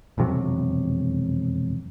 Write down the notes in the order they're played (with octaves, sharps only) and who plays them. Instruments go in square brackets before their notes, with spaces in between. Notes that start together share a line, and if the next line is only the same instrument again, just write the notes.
[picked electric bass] E1 F2 C3 F#3